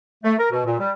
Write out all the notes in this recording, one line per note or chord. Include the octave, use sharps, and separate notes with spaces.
A3
A#4
B2
A#2
G3